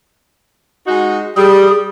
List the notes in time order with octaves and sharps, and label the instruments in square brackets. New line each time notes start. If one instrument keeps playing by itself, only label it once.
[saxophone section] G#3 D#4 F#4
[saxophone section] G3 [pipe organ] G#4